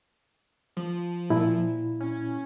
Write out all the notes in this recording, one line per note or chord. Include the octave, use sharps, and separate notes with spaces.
F3
A#2 E4
C#4